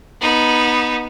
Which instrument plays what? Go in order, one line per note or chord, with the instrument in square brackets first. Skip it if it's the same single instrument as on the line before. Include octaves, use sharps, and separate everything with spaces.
[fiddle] B3 D#4